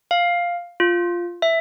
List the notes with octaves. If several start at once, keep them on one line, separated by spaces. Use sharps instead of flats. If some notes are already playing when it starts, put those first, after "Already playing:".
F5
F4
E5